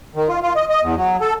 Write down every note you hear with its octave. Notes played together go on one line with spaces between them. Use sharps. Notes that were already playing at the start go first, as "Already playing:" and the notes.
D#3
F4
F4
D#5
D#5
E2
F#3
A4